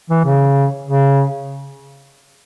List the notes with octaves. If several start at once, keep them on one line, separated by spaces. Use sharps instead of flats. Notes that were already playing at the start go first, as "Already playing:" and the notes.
E3
C#3
C#3